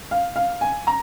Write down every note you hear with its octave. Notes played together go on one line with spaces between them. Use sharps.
F5
F5
G#5
A#5